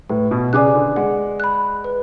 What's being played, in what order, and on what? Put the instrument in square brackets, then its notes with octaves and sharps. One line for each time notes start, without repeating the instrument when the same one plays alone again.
[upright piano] A2 [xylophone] B4
[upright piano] B2
[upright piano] C#3 [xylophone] D5 G#5 D6 F#6
[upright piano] D3
[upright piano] G#3 [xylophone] F#5
[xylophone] B5 F#6
B4